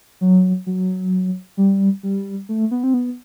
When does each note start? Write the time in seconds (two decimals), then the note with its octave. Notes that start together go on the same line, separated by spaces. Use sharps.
0.21 F#3
0.66 F#3
1.57 G3
2.03 G3
2.49 A3
2.71 B3
2.84 C4
2.94 B3